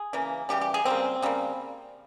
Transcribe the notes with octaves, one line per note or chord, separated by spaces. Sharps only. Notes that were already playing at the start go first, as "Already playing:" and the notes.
Already playing: G#4
C#3 E3 A#3
C#3 E3 G3 G4
G4
G#4
C#3 G3 A#3 C4
C#3 G3 A#3